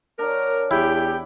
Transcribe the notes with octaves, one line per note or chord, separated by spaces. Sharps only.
F#3 D4 A#4
E2 E4 G4 G5